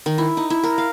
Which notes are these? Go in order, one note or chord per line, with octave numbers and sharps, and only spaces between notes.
D#3
E4
D#4
E4
A#4
F5